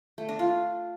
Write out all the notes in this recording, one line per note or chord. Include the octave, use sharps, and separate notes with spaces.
A3
D4
F4